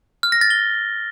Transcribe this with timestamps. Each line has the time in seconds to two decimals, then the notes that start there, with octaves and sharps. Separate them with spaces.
0.23 F6
0.32 A#6
0.41 A6
0.50 G7